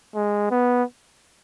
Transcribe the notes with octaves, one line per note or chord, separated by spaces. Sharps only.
G#3
B3